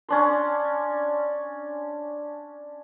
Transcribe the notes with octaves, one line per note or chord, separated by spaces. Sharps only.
C#4 D4 C6